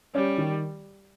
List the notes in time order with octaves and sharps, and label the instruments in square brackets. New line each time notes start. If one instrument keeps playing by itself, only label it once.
[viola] G3 [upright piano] C#4
[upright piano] D#3